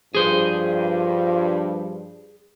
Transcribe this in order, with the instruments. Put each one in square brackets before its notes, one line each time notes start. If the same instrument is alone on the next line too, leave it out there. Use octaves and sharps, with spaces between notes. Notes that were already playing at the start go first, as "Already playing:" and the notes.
[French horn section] G2 F3 [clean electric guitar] G#4 C5